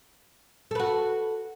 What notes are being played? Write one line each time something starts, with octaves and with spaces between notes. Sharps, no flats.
F#4 A4 B4